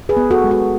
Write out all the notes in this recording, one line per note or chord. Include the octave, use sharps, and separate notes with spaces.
G#4 B4
B3
F#4 A4
G#3
F#4